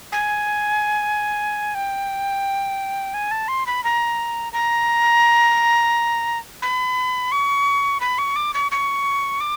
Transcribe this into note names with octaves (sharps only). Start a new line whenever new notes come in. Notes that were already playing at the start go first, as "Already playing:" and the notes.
G#5
G5
G#5
A5
C6
B5
A#5
A#5
B5
C#6
B5
C#6
D6
C#6
C#6
D6